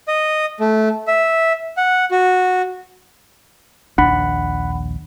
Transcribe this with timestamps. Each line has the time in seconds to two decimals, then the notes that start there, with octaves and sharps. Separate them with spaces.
0.08 D#5
0.60 A3
1.08 E5
1.77 F#5
2.11 F#4
3.98 A#1 D#2 D4 F#5 B5